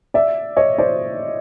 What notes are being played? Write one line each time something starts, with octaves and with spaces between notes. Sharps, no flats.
D5 E5
C#5 D#5
C5 D5